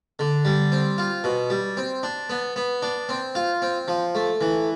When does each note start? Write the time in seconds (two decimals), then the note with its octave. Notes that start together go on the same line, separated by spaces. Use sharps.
0.19 D3
0.45 G3
0.72 C4
0.98 F4
1.24 B2
1.50 G3
1.77 C4
2.03 D4
2.30 B3
2.56 B3
2.82 D4
3.09 C4
3.35 F4
3.62 C4
3.88 F3
4.15 A3
4.41 E3